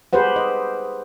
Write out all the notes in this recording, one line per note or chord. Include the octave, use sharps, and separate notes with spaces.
G4 G#4 B4 C5 F#5
D#5